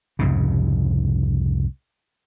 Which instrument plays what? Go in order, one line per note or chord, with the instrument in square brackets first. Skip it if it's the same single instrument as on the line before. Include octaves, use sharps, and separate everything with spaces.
[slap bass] C2 F2 G#2 C#3